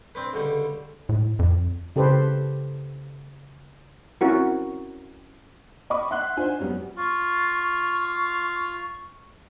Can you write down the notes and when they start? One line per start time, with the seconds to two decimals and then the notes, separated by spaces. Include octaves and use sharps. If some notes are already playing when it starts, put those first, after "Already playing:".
0.15 C4 D4 B4
0.33 C#2 D3 G3
1.09 A2
1.39 F2
1.96 C#3 G4 A4 B4 C5
4.21 C4 C#4 E4 F#4 A#4
5.90 D#5 B5 C#6 D6
6.11 E5 F#5 C6 F#6
6.37 D4 D#4 F4 C5 G#5
6.59 F#2 G3 B3
6.97 F4 C#6